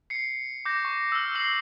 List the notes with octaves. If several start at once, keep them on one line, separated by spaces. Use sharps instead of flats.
C7 C#7
D6 G6 A#6
C#6
E6 F6
E6 C7 F#7